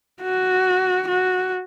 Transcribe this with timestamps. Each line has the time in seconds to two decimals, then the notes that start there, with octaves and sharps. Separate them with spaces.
0.22 F#4
1.07 F#4